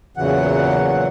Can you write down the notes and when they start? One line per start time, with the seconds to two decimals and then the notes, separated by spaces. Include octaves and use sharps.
0.17 E2 A#2 C#3 E3 F#3 F#5